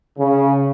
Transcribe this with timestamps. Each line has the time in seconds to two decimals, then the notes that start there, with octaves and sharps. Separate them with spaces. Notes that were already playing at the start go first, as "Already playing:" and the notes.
0.18 C#3